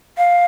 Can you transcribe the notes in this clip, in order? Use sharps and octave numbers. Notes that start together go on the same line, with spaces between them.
F5